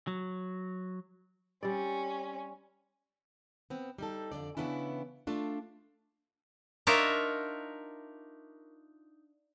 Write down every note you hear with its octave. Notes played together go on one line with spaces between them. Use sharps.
F#3
G3 C4 C#4 D5
B3 C4
G3 D#4 A4
F2 G#2 D3 D5
C#3 E3 B3 C#4 D4 E4
A3 D4 F4
D4 D#4 F4 A#4 C#5 E5